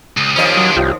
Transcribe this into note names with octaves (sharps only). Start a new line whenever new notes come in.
C#2 D#6
D#2 F3 C#4 D4 D#5
F#3
C2 F4 G4